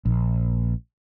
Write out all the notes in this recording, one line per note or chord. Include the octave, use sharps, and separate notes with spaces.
A#1